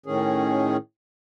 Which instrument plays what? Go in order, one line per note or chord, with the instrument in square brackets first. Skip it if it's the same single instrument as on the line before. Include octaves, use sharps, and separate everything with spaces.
[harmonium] A2 D#3 C#4 G#4